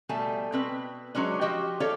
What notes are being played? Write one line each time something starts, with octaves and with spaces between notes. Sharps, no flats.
B2 G3 A3 G#5 A5
B2 C4 B4
F#3 G#3 C#4 D4
F3 F#4 G4 D#5
G4 A4 C#5 D5 F5